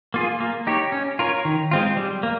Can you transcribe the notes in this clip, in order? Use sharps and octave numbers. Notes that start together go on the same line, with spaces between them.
A#3 F4 G#4
A#3
D#4 G4 C#5
C#4
F4 A#4 C#5
D#3
G#3 C4 F4
G3
A#3